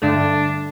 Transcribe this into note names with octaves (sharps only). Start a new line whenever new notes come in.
G2 D3 A3 D4